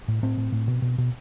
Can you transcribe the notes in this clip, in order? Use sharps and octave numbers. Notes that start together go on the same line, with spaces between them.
A2
A2 C4
A2
A2
B2
B2
B2